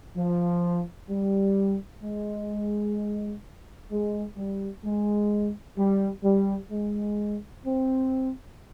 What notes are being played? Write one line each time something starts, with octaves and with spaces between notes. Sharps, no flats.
F3
G3
G#3
G#3
G3
G#3
G3
G3
G#3
C4